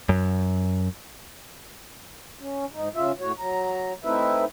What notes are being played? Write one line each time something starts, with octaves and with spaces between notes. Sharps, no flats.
F#2
C#4
G#2 D#4
C#3 F4 E5
A2 F#4 C#5
F#3 A#5
A3 C4 D#4 E4 B4 E5